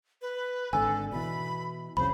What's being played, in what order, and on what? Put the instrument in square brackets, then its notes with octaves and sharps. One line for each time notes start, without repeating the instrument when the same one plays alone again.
[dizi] B4
[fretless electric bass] G#1 D3 [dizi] A4 [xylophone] G#5 E6
[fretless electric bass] B2 E3 [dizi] B5
[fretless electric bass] C2 F2 C#3 [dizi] C5 [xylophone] B5